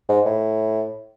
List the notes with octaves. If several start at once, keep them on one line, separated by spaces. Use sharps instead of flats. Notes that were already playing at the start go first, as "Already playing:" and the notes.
G#2
A2